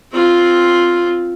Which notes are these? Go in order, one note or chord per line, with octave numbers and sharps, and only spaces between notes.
C4 F4